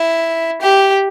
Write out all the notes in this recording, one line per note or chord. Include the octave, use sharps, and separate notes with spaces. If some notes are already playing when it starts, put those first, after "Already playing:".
Already playing: E4
G4